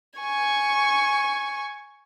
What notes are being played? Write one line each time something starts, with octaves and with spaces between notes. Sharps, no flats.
G#5 C#6